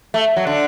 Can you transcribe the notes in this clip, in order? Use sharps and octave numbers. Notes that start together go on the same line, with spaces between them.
A3
F#3
D3